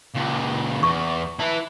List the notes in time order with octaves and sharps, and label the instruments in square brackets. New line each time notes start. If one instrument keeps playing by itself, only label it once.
[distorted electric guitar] C#2 A#2
[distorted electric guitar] E2 [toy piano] C#6
[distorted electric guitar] E4 B4 [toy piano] A5